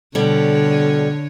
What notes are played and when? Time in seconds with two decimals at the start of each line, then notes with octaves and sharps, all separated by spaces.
0.15 B2 D3 G3 A4 C#5